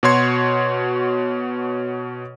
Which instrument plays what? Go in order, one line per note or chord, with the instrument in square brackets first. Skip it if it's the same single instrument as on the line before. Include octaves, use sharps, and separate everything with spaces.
[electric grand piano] B2 F#4 C#5 C6 G#6